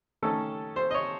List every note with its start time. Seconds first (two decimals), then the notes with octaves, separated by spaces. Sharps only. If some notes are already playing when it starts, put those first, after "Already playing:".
0.23 D#3 A3 C#4 A4
0.76 C5
0.91 D#5
0.94 C#5